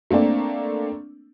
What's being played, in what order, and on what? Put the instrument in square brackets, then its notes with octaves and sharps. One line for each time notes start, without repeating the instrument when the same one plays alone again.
[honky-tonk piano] A3 A#3 C4 D4